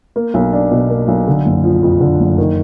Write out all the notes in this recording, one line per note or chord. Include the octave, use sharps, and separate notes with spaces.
A#3
B1
D4
B2
A#3
B1
D3
F#1
F3
F2
D3
F#1
D#3